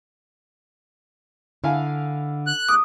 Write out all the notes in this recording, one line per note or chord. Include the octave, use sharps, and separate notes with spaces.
D3 E4 F5 G#5
F#6
D6 D#6